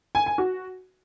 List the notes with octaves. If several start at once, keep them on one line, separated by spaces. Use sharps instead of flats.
G#5
G#5
F#4